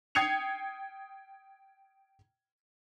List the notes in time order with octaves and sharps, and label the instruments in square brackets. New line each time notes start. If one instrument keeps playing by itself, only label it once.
[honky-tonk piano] G5 D#6 G#6 C7 C#7 F7